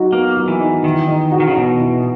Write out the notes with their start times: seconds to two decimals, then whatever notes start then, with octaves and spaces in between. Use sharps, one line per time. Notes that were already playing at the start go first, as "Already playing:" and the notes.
Already playing: F#3 D#4 F#4
0.12 A#3 B3
0.37 F#3
0.48 E3
0.60 D#4
0.83 D#3 E3
1.07 D#4
1.32 F#4
1.40 D#3
1.48 C#3
1.56 B2 B3
1.80 E3